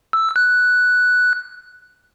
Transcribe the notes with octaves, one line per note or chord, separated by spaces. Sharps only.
E6
F#6